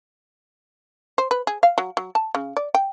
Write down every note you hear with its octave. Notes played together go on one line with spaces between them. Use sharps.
C5
B4
G#4
F5
F#3
F#3
A5
C#3
D5
G5